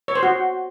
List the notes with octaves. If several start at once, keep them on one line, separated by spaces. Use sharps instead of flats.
C#5
C5
F#4